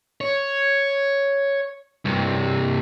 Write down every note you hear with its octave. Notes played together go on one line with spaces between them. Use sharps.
C#5
C2 G2